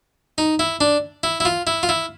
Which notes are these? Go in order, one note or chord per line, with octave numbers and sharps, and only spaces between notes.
D#4
E4
D4
E4
E4
F4
E4
F4
E4